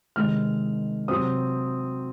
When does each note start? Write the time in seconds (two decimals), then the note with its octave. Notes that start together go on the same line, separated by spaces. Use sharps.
0.16 C3 D#3 G#3 F6
1.08 C3 F#3 C4 D#6